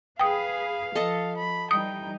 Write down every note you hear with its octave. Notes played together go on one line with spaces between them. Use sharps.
G#4 B4 F5 G5 D#6
F3 A4 D#5 A5
B5
E3 G3 D#4 G5 D#6